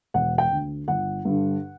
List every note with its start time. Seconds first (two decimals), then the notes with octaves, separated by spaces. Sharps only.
0.14 E1 F#5
0.38 G5
0.51 D2 D3
0.88 G1 F#5
1.25 G2 D3